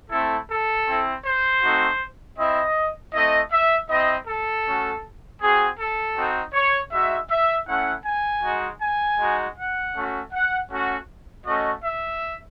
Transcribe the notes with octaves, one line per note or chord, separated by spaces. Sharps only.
A3 C4 E4 A4
A4
C4 E4
C5
A3 C4 D#4 F#4
C4 E4 D#5
A3 C4 E4 D#5
E5
C4 E4 D#5
A4
A3 C#4 F#4
C4 F#4 G#4
A4
C4 D#4 F#4
C#5
G#3 D#4 F#4 E5
E5
A3 C#4 E4 F#5
G#5
G#3 D#4 F#4
G#5
G#3 D#4 F#4
F#5
A3 C#4 F#4
F#5
A3 C#4 F#4
A3 C#4 F#4 D#5
E5